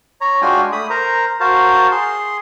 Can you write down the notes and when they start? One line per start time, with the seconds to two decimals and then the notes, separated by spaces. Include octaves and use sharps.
0.21 C#5 A#5
0.42 G#3 D4 F4 F#4 G5 G#5
0.72 A3 B5 D#6
0.90 A#4 C5 A#5
1.40 F#4 A#4 C5 F5 A5
1.92 G#4 C6